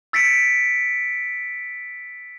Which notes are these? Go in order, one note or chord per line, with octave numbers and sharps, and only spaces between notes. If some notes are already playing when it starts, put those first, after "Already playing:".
E6 A6 B6 C#7 D7